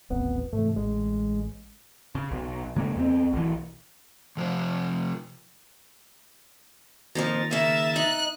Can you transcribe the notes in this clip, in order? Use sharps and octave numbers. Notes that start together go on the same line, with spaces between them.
D#1 A1 B3 C4
G#2 C3 E3 A3
A1 G#3
C#3
B1
C#3 G#3 A#3 C#4
E2 A3 C4
B1 E3
C3 F3 C5
F2 A#2 D#3 F3 A#5 A6
C#3 A#3 E5 E7
D#4 F#6